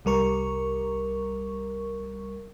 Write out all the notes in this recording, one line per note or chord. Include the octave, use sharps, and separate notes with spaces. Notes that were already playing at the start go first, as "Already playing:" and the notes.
C2 G3 A#4 C#6